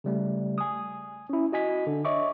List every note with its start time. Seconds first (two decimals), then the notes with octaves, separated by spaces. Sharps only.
0.04 C#3 G3 A3
0.58 G#5 D#6
1.30 C#4 E4
1.52 F#4 D#5 G#5 B6
1.87 D3 D4
2.05 C#5 D#5 E5 C#6 D6